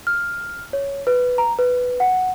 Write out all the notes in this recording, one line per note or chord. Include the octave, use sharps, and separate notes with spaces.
F6
C#5
B4
A#5
B4
F#5